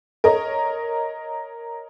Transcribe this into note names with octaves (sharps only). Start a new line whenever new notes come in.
A#4 C#5 D#5